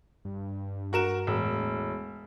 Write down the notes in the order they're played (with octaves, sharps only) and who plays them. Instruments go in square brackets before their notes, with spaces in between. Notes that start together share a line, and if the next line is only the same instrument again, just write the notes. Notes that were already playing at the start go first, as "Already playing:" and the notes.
[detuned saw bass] G2
[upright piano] F#4 A#4 E7
[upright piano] E1 [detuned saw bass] A2